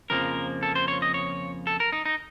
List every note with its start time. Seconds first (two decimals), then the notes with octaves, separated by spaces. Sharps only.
0.10 F2 C#3 F3 A#3 A#4
0.63 A4
0.75 C5
0.88 C#5
1.02 D#5
1.14 C#5
1.67 A4
1.80 A#4
1.93 D#4
2.06 D#4